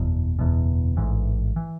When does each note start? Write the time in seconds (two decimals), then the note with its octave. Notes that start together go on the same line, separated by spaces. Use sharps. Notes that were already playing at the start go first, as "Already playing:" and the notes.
Already playing: F#1 E2 B2
0.39 F#1 E2 B2
0.97 A1 G#2 E3
1.56 E3